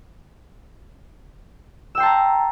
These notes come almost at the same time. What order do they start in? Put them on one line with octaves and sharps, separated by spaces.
E6 G5 C6 A5 A#5